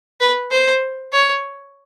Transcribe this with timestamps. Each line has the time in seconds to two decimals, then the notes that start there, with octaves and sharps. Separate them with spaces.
0.20 B4
0.51 C5
1.12 C#5